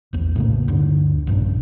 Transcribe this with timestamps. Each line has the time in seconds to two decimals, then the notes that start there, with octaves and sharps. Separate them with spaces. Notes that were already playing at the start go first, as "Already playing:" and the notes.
0.13 A#1 E2
0.36 A2 C#3 A#3
0.68 D2 G2 D3
1.27 A#1 G2 A#2 D4